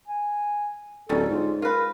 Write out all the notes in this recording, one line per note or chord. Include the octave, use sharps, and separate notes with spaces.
G#5
D1 G3 C#4 D#4 A4
G#2 F4
F4 A#4 B4